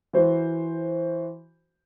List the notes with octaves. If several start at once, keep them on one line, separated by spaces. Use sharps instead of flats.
E3 F#4 C5